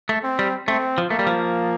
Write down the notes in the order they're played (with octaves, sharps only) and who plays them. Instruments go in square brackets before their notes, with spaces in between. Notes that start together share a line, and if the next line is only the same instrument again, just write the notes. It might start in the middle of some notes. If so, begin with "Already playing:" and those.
[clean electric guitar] A3
[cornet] C4
[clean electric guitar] G3
[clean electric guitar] A3 [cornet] C4
[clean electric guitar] F3
[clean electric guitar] A3 [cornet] A#3
[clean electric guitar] G3
F3